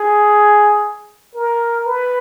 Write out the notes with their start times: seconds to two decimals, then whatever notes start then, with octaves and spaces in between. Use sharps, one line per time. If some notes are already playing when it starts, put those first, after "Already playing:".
Already playing: G#4
1.35 A#4
1.86 B4